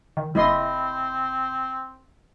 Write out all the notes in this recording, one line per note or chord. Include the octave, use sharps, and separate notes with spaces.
D#3
F#1 C4 E4 D#5 C6